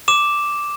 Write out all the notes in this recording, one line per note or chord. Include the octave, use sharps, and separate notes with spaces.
D6 E7